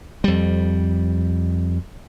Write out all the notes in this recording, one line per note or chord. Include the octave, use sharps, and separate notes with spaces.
F2 G3